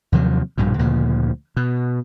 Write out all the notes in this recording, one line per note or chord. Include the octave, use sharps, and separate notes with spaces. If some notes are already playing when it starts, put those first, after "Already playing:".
D#2 C3 F3 F#3
A#1 G2 B2
D2 A#2 C#3 F3
B2